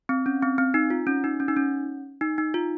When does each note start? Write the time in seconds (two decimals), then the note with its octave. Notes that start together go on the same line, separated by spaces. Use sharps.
0.09 C4
0.26 C#4
0.43 C4
0.58 C4
0.74 D#4
0.90 F4
1.07 C#4
1.24 D#4
1.40 C#4
1.48 D#4
1.57 C#4
2.21 D#4
2.38 D#4
2.54 F4